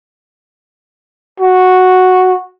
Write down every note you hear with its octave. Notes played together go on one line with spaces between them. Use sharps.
F#4